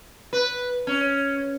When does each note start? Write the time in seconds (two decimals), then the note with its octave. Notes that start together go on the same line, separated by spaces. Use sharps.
0.33 B4
0.87 C#4